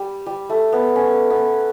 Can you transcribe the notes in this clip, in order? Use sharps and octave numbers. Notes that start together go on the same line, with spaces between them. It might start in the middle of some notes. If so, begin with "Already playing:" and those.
Already playing: G3
G3
A3
B3
C#4
B3